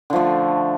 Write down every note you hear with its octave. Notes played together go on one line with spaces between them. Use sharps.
D3 F3 A3